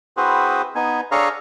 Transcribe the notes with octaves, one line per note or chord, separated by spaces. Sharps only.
C4 E4 F#4 G#4 B4 C5
B3 D#4 G#5
D4 G#4 A4 C#5 F5 A#5